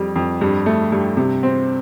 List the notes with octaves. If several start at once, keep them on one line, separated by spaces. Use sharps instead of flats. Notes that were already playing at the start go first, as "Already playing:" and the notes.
Already playing: F2 G3
F2
G2
A3
G2
C3
C4